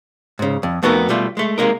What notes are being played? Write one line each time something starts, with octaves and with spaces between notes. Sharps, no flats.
G#2 C#3
F2
F2 A3 B3 D#4 F#4 A#4
B2 G3 A3 F4
G#3 A3
C3 G#3 A#3 D#4 A#4